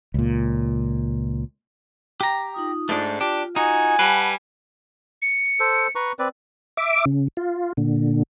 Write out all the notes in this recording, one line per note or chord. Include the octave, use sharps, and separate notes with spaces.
C#2 A#2
G4 G5 A#5
D#4 F4 D#6
G#2 A3 D4
D4 F4 G4
D#4 F#4 G#5
G3 B4 F#5 A5
C#7
A4 C5
B4 A#5 C#6
C4 B4 D5
E5 D6
C#3
F4
A#2 D3